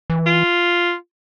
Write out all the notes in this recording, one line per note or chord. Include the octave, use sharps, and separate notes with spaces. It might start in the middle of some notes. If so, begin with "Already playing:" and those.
E3
F4